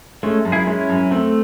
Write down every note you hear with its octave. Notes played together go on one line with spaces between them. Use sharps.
G#3 A3 C#4
F#2
E4 G#4
G#3 C#4 E4
F#2
A3 C4